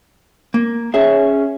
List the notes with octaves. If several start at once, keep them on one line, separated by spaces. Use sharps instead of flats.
A#3
C#4 G#4 E5